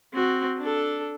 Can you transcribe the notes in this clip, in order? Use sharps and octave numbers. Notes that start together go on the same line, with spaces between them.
C4 F#4
D4 A4